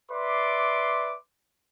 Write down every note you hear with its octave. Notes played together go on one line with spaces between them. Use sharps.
B4 D5 E5 C6 D6